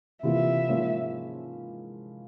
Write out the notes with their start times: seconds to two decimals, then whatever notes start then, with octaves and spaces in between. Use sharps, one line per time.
0.23 C3 E3 A#3 F4 E5
0.69 G#2 F3 A#3 C#4